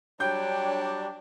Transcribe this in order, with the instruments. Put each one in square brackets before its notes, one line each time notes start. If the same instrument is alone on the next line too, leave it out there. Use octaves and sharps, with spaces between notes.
[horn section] F#3 G3 D4 [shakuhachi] C#5 [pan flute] G5 [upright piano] G6